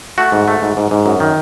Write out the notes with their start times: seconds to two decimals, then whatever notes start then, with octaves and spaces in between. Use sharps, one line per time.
0.18 A3 F#4
0.32 G#2
0.48 A3
0.62 G#2
0.77 G#2
0.91 G#2
1.06 F#2
1.20 D#3